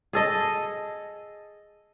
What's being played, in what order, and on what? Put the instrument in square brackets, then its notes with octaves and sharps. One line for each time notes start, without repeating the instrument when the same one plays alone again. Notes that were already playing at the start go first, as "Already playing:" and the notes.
[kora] G#4 A4 D#5